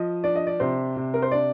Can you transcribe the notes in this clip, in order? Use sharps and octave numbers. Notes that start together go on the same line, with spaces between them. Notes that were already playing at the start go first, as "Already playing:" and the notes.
Already playing: F3 D#5
D4 D5
D#5
D5
C3 C5
C3
A#4
C5
D4 D5